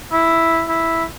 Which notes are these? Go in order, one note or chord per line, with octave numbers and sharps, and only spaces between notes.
E4
E4